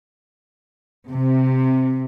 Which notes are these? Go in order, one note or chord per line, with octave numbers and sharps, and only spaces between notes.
C3